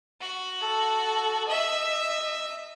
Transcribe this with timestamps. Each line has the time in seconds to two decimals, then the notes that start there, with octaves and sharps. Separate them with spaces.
0.21 F#4
0.61 A4
1.49 D#5 E5